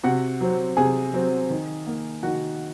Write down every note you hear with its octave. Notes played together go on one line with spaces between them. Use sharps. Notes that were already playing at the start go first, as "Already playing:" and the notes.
C3 F#4 F#5
F#3 C4
C3 G#4 G#5
F#3 C4
D#3
A#3
D#3 F#4 F#5